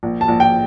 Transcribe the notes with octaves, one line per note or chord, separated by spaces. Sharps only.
A#1
A5
A#1
G5